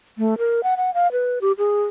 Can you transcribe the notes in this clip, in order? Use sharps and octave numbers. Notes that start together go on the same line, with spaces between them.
A3
A#4
F#5
F#5
F5
B4
G4
G#4